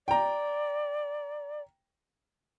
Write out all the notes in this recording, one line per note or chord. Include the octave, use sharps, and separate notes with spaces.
D5 G5 A#5